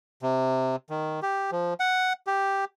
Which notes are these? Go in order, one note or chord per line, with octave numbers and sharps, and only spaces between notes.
C3
D#3
G4
F3
F#5
G4